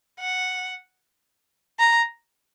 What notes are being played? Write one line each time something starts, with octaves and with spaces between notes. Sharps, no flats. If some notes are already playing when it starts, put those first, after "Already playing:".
F#5
A#5